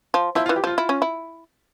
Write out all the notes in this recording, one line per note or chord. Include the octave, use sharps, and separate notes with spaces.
F3
F3 E4
F4
E3
G4
F3 F4
E4
C#4
E4